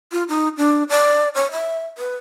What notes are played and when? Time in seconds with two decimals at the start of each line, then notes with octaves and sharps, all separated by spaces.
0.12 F4
0.29 D#4
0.57 D4
0.89 D5
1.35 C#5
1.52 E5
1.98 B4